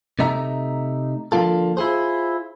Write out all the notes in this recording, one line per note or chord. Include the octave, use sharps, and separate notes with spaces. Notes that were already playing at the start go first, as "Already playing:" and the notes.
C3 A3 D#4 E5 A#5
D3 F3 A#3 F4 A4
E4 F4 G#4 C5